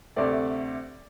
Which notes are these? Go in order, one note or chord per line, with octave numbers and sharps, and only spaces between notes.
D2 C3 A3 C4 D5